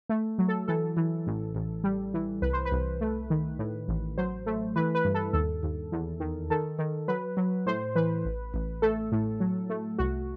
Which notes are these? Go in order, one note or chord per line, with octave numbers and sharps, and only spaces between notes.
A3
F#3
A4
E3 A4
E3
A1
A1
G3
E3
C2 B4
C5
B4
C2
A3
D#3
A2
A1
F#3 C5
A3
E3 B4
B4
G2
A4
D#2 A4
D#2
E2
D#3
D#3 A4
D#3
F#3 B4
F#3
A2 C5
E3 B4
A1
A1
A3 A4
A2
F#3
A3
C2 F#4